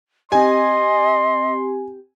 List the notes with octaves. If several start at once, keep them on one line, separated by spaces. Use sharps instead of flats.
C4 G4 D#5 G#5 C6